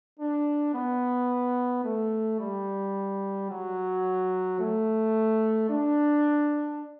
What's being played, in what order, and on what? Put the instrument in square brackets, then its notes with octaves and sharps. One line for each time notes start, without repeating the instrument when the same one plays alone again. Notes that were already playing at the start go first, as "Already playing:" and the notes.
[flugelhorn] D4
B3
A3
G3
F#3
A3
D4